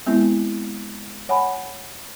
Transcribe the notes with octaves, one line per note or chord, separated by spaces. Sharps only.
G#3 B3 C4 E4
C#5 F#5 G#5 B5